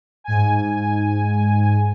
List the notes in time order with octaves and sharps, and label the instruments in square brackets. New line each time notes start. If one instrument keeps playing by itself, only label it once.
[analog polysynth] G#2 G#5